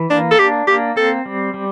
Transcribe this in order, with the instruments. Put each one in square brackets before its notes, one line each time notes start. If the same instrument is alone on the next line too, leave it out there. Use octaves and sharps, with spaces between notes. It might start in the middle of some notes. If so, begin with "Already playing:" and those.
Already playing: [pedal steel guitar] E3
[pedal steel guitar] A#3 [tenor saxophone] D4
[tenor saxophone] A4
[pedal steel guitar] D4 [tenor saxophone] G4
[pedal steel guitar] A#3 [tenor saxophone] G4
[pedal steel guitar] C4 [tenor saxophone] A4
[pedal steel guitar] G3
G3